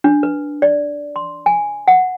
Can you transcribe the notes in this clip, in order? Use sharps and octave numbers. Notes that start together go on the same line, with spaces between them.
D4
B4
D5
C6
G#5
F#5